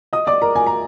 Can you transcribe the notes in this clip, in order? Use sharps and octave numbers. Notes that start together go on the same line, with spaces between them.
D#5 D#6
D5 D6
A#4 A#5
G#5
A#5